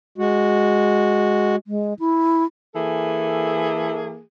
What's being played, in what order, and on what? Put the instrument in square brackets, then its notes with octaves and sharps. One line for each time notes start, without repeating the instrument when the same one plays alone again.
[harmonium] G#3 F#4
[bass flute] G#3
E4
[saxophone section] E3 A#3 G#4 A4